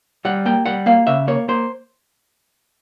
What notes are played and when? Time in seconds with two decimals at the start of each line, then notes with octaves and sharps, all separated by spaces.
0.25 G3 F#5
0.46 A#3 G5
0.66 G3 F#5
0.86 A#3 F5
1.07 C#3 E5
1.28 A#3 C#5
1.48 A#3 C5